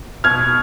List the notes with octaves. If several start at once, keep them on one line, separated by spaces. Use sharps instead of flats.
B2 F6 G#6